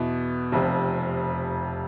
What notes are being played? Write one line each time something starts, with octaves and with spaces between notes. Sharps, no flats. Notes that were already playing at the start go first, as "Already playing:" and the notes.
Already playing: E2 B2 B3 E4
F1 F2 C3